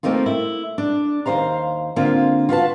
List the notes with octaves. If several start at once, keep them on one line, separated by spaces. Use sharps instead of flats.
A3 A#3 C4 D#4 F4
E4
D4
D#2 C#3 C5 F5 A#5
D3 A#3 C4 F4
F4 F#4 B4 A5